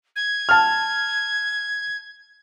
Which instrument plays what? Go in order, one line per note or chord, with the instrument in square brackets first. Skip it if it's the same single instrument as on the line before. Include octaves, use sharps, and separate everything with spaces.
[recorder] G#6
[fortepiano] A5 F6